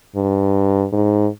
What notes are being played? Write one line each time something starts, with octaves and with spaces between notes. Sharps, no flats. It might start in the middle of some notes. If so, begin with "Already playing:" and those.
G2
G#2